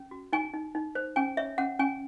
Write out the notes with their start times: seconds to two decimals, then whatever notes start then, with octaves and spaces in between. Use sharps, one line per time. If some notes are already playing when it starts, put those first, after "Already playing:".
Already playing: C#4
0.11 F#4
0.33 D#4 G#5
0.53 D#4
0.75 D#4
0.95 C5
1.16 C#4 G#5
1.37 C#5 E5
1.58 C#4 F#5
1.79 C#4 G#5